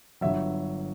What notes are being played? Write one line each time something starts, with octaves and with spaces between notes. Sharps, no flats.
G1 G2 F#3 E5